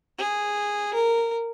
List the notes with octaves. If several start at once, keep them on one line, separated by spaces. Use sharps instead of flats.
G#4
A#4